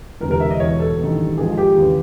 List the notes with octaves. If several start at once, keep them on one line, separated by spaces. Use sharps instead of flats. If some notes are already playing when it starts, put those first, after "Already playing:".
E1 D2 C3 A#4
A#4
E5
D#5
E2 B2 C#5
A4
A1 G2 D#3
A#1 G#2 F3 G#4
G4
D#2 C#3 E3